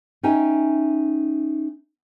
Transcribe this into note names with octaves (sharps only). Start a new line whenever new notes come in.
C#4 D#4 E5 G5 G#5